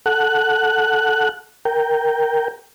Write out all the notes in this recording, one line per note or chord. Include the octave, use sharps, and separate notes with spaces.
A4 F#5 F#6
A#4 G5